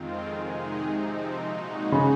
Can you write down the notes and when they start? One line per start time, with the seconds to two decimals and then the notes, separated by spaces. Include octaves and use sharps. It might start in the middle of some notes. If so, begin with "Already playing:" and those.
Already playing: F2 D#3 G#3 C4 F4
0.27 C3 D#3 G#3 D#4 G#4
0.82 C3 F3 C4 D#4
1.37 A#2 G#3 D#4 F#4
1.92 C#3